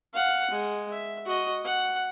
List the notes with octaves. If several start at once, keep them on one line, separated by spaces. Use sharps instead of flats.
F5 F#5
G#3
E5
F#4 D#5
F#5